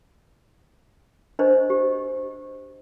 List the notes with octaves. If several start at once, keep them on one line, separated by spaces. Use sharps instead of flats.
D4 B4 C5 D#5
G4